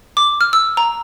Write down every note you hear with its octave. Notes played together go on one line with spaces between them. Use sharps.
D6
F6
E6
A#5